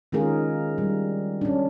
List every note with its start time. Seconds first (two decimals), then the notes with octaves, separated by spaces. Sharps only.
0.12 D#3 G#3 C#4 F4 G#4 A#4
0.78 G3
1.41 C#4 D4